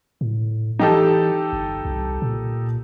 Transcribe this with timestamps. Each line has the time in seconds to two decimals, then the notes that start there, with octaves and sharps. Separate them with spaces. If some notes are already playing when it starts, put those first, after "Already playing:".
0.21 A2
0.79 E3 D#4 G4 A4
1.53 G1
1.85 C2
2.22 A#2